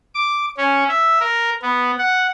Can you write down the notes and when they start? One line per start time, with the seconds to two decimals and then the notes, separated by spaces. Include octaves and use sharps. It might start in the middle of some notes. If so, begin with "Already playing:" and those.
0.15 D6
0.58 C#4
0.88 E5
1.20 A#4
1.62 B3
1.99 F#5